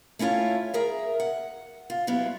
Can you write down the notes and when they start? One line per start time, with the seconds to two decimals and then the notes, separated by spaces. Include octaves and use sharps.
0.19 A3 C#4 E4 F4 C#5
0.74 G#4 A#4 E5
1.20 F#5
1.90 F4
2.07 F#3 G3 B3 E4 F4